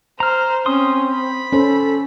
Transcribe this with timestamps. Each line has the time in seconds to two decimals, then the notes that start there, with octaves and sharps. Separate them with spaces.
0.20 C5 A#5 F6
0.66 C4 C#4 C6 D#6
1.13 B5
1.53 C#4 A4 C5